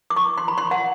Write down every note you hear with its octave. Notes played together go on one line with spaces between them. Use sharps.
D6
C#6
C6
B5
C6
F#5